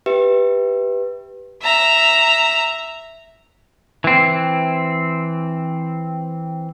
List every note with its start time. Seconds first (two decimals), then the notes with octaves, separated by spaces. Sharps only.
0.06 G4 B4 E5
1.63 E5 A#5
4.04 E3 C4